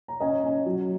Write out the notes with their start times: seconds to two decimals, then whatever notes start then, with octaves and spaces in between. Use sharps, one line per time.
0.08 A#5
0.20 C#4 D#5 G#5
0.44 C#4
0.66 F#3